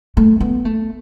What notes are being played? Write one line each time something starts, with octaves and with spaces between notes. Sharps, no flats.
A3
B3
A3